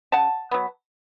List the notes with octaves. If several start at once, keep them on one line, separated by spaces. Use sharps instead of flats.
C#3 F#5 A5
F#3 B3